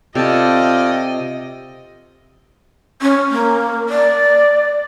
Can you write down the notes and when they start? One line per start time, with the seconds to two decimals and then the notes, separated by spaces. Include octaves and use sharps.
0.15 C3 F4 A4 D5 D#5 G5 A5
3.02 C#4
3.30 A#3
3.89 D5